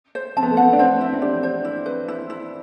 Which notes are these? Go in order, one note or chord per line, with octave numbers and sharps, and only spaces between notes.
C5
C4 A5
B3
A3
B3 F#5
D4
C4 C5
E4
C4
D4 G4
C5
E4
B4
E4
E4